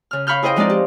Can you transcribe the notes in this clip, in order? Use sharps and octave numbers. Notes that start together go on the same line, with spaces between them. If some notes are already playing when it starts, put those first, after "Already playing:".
C#3 F6
F5 B5 C#6 F6 G6
E4 G#4 C5 D#5 G5
F3 G#3 C4 D#4 F4 D5
G4